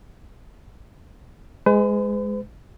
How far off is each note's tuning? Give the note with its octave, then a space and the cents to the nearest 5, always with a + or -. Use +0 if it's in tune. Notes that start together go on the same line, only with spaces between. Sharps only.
G#3 +0 B4 +45